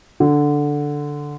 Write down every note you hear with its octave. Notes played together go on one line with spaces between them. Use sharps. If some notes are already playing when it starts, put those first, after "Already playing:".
D3